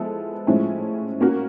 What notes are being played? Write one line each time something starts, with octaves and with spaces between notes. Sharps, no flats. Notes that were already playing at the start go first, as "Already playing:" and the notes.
Already playing: F3 G#3 B3 E4 A4
A2 F3 G#3 C#4 E4
A#3 C#4 F#4 A#4